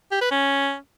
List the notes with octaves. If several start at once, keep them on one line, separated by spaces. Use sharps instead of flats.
G4
B4
C#4